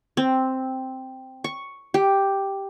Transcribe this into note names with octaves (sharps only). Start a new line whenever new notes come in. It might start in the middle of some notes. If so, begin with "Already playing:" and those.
C4
C#6
G4